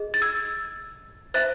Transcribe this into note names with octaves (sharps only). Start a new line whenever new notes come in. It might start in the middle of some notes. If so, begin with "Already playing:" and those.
Already playing: G#4 D#5
A6
E6 G#6
C5 E5 F#6 A6